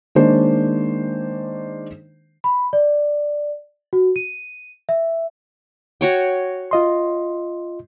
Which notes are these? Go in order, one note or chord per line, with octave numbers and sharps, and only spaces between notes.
D#3 G#3 A#3 D4 C5 C#5
B5
D5
F#4
D#7
E5
F#4 C#5 G5
F4 D#5 C6